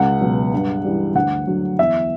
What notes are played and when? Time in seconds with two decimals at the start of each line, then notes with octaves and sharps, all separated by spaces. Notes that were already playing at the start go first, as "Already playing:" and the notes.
Already playing: C#2 F#5
0.21 B2 F#3
0.53 G2
0.84 E3 G3
1.15 D2 F#5
1.47 D3 F#3
1.79 E2 E5